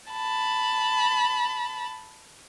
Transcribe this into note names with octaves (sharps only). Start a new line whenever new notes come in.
A5 B5